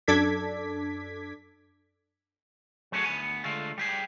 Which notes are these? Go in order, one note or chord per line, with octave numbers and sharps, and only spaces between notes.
F#2 D4 A4 D6 G#6 B6
F#3 A3 C#4 D#4 F#4 G#4
D2 E3 B3 G#5
D3 G#3 A3 F4
G3 G4 G#4